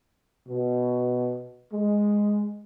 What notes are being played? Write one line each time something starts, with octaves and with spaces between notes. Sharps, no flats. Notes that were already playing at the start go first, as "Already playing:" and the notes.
B2
G#3